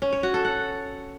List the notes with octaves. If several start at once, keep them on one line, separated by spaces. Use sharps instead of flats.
C#4
C#5
F#4
A4
F#5